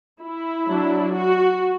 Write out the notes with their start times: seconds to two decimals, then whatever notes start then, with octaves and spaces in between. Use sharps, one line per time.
0.21 E4
0.67 F#3 D4
1.14 F#4